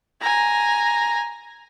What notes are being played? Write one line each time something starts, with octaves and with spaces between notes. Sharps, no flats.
G#5 A#5